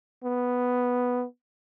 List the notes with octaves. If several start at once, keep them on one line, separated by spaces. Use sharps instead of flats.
B3